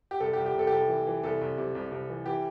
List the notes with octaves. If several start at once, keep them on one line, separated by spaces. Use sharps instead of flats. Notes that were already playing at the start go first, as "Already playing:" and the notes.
G4
C2 A4
G4
C2
G4
C2 A4
G4
C2 A4
E3
E3
C2 A4
C2
C3
C2
C2
E3
E3 G4